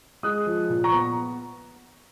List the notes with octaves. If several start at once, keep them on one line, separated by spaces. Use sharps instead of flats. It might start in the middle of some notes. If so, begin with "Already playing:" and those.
G#3 D#6 F#6
F3
A#2
A#5 C#6
B3